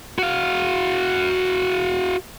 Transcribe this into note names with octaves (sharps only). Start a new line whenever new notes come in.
F#4 F5